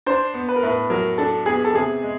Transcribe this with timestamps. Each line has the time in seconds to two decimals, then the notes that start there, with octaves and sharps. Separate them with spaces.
0.06 D4 C5
0.34 B3
0.49 B4
0.56 A#4
0.63 A2 B4
0.90 F#3 A#4
1.18 D4 A4
1.46 B3 G#4
1.65 A4
1.74 C3 G#4
2.02 G#3